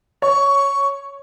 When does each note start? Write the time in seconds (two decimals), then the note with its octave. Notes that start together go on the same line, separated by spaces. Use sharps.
0.22 C#5 C#6